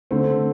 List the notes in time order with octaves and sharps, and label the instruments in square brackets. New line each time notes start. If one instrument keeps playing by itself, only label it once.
[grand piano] D3 A3 C4